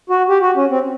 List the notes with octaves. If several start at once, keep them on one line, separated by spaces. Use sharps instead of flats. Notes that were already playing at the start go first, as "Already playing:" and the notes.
F#4
G4
F#4
C#4
C4